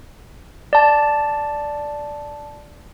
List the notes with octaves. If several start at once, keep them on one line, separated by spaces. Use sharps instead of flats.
D5 A5